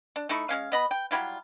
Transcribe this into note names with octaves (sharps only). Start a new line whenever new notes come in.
D4
A3 D#4 E4 C#6
G#3 C#4 F5
B3 D#5 B5
G5
F#3 G3 E4 F4